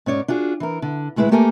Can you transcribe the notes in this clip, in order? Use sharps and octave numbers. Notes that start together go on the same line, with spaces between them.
G#2 C#4 C#5 D5
D4 F4 F#4 G#4
E3 A#4
D3
D2 A2 G#3 E4 B4
A3 A#3 G4 A4 A#4 G#5